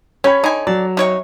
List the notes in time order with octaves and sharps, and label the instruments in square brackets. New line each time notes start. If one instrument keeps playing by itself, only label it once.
[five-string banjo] C#4 [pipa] G4 [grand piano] C#5 B5
[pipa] D3 G#5 [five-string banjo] D#4
[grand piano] F#3 [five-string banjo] D5
[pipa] C3 C#5 C#6 [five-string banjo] D#4